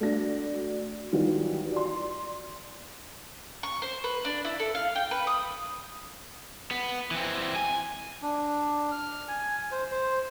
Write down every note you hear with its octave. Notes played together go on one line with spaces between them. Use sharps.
A3 D4 F#4 A#6
D#3 E3 F#3 G3 F4
D5 C6
C#6
C5
B4
D4
E4
A4
F5
G5
B4
D#6
B3
E3 C4
G#5
D4
F6
G#5
C5
C5